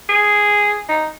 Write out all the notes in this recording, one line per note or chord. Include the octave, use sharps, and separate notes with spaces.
G#4
D#4